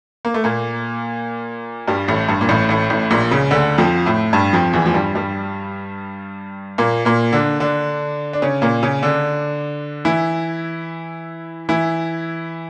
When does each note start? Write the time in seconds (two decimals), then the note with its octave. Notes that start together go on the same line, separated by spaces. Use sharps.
0.25 A#3
0.34 A3
0.44 A#2 A#3
1.88 G2 G3
2.08 A1 A2
2.28 G2
2.41 A#2
2.49 A1 A2
2.69 A1 A2
2.90 A1 A2
3.11 A#1 A#2
3.31 C#2 C#3
3.51 D2 D3
3.78 F2 F3
4.06 A2 A3
4.33 G2 G3
4.53 F2 F3
4.73 E2 E3
4.86 F3
4.94 G2 G3
5.15 G2 G3
6.78 A#2 A#3
7.05 A#2 A#3
7.32 D3 D4
7.60 D3 D4
8.33 D4
8.42 C#3 C#4
8.62 A#2 A#3
8.83 C#3 C#4
9.03 D3 D4
10.05 E3 E4
11.69 E3 E4